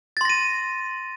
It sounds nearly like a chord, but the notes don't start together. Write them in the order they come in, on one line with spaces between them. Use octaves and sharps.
A6 C6 A#6 D#7